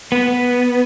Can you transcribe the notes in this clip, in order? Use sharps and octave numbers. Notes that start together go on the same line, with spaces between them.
B3